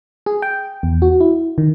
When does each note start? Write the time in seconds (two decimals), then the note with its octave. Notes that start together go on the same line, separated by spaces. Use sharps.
0.26 G#4
0.42 G5
0.83 E2
1.02 F#4
1.20 E4
1.58 D#3